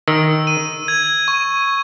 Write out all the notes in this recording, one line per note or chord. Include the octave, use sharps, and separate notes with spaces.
D#3 E6
D#7
G#6
C#6